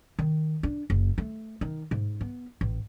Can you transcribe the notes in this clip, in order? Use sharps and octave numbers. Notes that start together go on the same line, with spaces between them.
D#3
D4
F#1
A3
D#3
G#2
B3
A1